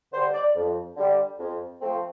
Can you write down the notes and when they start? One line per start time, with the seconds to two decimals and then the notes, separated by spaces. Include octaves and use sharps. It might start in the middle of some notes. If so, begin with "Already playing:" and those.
0.12 D3 G3 C5
0.33 D5
0.55 F2
0.96 D3 G3
1.39 F2
1.80 F3 A3 C4